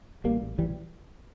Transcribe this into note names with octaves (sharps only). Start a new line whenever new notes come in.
A1 G3 A#3
A1
A1 E3 G3